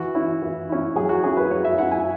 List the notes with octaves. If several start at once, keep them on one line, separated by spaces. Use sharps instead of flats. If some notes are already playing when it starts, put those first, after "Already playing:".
Already playing: E3 F#4
C#4 E4
E3
C#4 E4
F#3 G#4
F#4
C#4 E4 G#4
B4
F#3 C#5
E5
C#4 E4 F#5
G#5